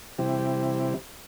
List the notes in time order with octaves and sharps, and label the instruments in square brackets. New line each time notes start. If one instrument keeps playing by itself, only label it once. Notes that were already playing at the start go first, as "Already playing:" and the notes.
[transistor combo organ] C3 E3 G3 C4 E4 G4